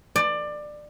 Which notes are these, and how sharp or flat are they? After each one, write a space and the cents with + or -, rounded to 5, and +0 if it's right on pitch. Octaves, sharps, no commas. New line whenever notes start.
D5 +20